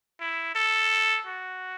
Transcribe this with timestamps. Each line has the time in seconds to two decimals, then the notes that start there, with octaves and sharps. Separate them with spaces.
0.20 E4
0.55 A4
1.26 F#4